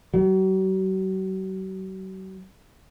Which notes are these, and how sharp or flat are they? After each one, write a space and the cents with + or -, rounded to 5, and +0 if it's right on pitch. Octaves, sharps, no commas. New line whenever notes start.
F#3 +40